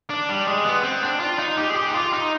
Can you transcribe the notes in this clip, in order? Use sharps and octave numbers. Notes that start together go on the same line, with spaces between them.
D4
G3
G#3
B3
C4
D4
F4
D#4
G4
G#4
G4
D#4
F4
D#4